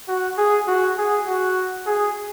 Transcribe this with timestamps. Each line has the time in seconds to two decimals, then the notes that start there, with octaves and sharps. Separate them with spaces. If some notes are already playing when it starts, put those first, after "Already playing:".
0.08 F#4
0.38 G#4
0.67 F#4
0.97 G#4
1.27 F#4
1.86 G#4